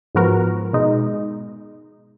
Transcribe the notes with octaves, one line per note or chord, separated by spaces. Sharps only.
G#2 F3 B3 F#4 A#4
B2 G#3 D#4